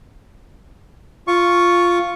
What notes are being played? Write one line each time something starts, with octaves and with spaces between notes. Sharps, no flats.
F4 C#6